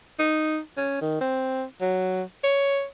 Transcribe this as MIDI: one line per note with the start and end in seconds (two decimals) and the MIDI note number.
0.20 0.60 63
0.77 1.00 61
1.02 1.20 51
1.21 1.64 60
1.81 2.23 54
2.44 2.85 73